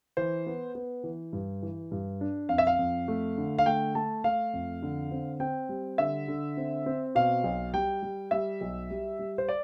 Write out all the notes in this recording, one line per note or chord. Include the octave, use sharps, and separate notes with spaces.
E3 C5
B3
B3
E3
G2
E3
G2
D4
F2 F5
E5
F5
F2
A3
D3
F5
A3 G5
A3 A5
A3 F5
F2
D3
C4
C4 G5
G3
D3 E5
D3
C4
C4
B2 F5
B1
G3 G5
G3
G3 E5
B1
G3
G3
C5
D5